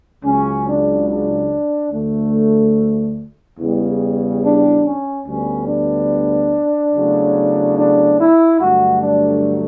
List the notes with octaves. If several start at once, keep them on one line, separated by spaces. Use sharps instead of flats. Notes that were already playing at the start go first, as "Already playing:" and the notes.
C#2 C#3 F#3 C#4
D4
D4
D2 D3 A3
E2 C#3 E3 G3
D4
C#4
D2 D3 G3 B3 C#4
D4
E2 C#3 F#3 A3
D4
E4
G2 D3 F#3 A3 F#4
D4